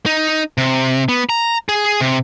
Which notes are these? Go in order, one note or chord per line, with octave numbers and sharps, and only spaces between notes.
D#4
C3
B3
A#5
G#4
C3